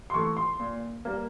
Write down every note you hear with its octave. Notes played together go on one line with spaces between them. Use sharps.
C6
E3 A3 C#6
C6
A#2
G3 A#3